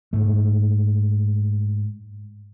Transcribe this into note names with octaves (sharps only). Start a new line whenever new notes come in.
G#2 A3